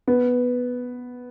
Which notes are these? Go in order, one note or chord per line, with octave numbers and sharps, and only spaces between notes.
B3